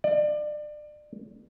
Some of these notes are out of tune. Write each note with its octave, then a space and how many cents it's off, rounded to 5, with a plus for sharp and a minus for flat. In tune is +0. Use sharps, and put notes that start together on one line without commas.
D5 +30